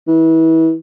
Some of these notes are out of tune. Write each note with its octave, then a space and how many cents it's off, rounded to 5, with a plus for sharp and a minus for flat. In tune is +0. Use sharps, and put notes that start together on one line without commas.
E3 -30